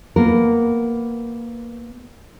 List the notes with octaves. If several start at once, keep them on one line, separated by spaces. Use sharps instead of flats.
A#3 B3 A#4